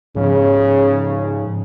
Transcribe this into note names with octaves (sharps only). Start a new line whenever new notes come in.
G#2 C#3 F3